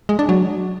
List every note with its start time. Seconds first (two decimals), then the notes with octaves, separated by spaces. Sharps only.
0.09 G#3
0.19 D4
0.29 F#3